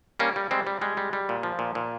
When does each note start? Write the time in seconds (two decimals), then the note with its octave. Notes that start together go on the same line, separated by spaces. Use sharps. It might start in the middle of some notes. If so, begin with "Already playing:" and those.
0.19 G3 A#3 C#4
0.36 G3
0.51 G3 G#3 C4
0.67 G3
0.81 G3 G#3
0.97 G3
1.13 G3
1.29 A#2
1.43 F3
1.59 A#2
1.75 A#2